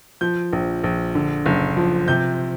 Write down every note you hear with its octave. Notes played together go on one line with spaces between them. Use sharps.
F3 G6
A#1
A#1
D3
F#1
F3
C3 G6